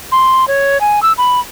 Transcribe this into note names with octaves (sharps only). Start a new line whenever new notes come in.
C6
C#5
G#5
E6
B5